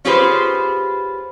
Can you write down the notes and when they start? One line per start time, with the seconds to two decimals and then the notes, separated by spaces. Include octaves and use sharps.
0.05 C#4 F4 G4 G#4 B4 C5